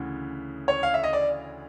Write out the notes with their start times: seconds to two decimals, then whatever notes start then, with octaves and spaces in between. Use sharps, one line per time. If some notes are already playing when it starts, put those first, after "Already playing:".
Already playing: D2 C#3 E3
0.68 C#5
0.83 F5
0.94 E5
1.03 D#5
1.13 D5